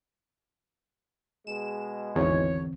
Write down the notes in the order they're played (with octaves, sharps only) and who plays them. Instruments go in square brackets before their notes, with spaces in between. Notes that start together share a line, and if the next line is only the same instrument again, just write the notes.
[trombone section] B2 G#3 [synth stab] E7
[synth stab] G#1 E2 [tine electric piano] D3 E3 C4 [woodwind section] C#5